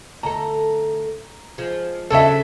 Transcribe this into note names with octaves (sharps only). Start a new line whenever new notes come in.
D2 A4 A#5
F3 G#3
C#3 F#3 D4 A4 E5